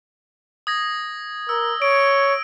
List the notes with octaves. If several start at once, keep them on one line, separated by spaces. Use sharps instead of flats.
D#6 G#6 A#6
A#4 E6
C#5 D7